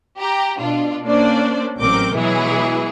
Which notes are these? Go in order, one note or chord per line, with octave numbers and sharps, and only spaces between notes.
G4 A#5
B2 D4 F4
A#3 C#4 D4 C5 D5
A1 F#3 C4 A#4 D6 G6
B2 E3 F#3 G#3 E4 G#4